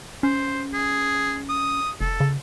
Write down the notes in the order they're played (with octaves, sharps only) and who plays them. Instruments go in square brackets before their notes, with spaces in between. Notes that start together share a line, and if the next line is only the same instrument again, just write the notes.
[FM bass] C#4 [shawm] C5
[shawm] G#4
D#6
[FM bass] F1 [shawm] A4
[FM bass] C#3